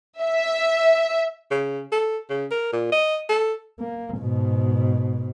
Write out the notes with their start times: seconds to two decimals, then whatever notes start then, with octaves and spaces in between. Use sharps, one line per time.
0.21 E5
1.51 C#3
1.92 A4
2.30 C#3
2.51 A#4
2.73 A#2
2.92 D#5
3.29 A4
3.80 A#3
4.18 G#2 B2